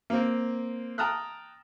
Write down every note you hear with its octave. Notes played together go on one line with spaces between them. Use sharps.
A#3 C4
G5 A5 A#5 D#6 F6 F#6